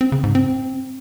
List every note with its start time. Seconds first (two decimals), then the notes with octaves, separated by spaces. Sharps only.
0.01 C4
0.12 C#3
0.24 G#2
0.35 C4